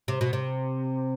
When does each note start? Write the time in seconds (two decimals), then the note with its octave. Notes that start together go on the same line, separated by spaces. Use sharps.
0.08 C3
0.21 B2
0.33 C3